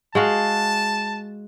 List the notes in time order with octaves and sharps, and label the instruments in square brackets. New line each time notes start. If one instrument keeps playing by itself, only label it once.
[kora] G#3 F#4 F5 [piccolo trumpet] A5